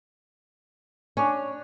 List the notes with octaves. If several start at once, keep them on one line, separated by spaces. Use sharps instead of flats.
C#4 D4 C#5